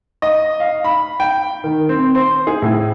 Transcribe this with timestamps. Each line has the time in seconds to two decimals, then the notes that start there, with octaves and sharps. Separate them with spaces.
0.22 D#5
0.60 F5
0.84 B5
1.20 G5
1.64 D#3
1.89 C4
2.15 C5
2.47 G#4
2.62 A2